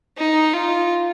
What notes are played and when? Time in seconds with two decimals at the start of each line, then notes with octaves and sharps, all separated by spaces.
0.18 D#4
0.53 F4